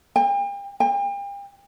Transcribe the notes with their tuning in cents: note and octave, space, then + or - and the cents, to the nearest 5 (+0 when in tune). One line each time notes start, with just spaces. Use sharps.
G5 +40
G5 +40